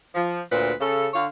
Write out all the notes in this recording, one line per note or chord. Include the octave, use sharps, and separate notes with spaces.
F3
D2 A#2 B4 C5
C#3 A4
D3 C#5 F5